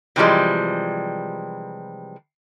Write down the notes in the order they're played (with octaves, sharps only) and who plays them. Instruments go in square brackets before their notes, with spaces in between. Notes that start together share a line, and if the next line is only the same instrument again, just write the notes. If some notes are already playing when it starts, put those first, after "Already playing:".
[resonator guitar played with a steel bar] C3 E3 F3 G3 G#3